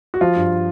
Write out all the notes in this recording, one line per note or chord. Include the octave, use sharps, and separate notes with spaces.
F#4
F3 F4
G2